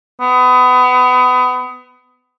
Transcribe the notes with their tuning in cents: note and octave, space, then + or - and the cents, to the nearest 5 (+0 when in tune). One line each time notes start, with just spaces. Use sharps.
B3 +25